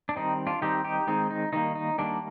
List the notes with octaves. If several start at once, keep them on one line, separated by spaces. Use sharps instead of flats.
D4
D#3 G3 C4 D#4
D4 F4
D#3 G3 C4 D#4 G4
D#4 G4
D#3 G#3 C4 D#4
D#4
D#3 G3 A#3 D#4
D#4
D#3 G3 A#3 D4